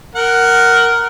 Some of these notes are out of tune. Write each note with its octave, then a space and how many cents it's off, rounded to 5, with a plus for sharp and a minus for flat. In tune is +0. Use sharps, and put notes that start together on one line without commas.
A#4 +0 F#5 +15